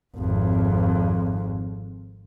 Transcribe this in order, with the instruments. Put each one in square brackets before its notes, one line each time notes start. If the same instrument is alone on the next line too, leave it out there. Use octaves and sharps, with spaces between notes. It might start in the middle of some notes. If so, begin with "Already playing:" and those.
[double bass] G#1 F2